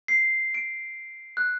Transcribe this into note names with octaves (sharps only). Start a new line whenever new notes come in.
C7
D7
F#6